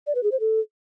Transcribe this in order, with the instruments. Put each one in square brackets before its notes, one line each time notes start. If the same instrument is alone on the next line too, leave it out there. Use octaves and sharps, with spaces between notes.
[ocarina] D5
B4
G#4
C5
A4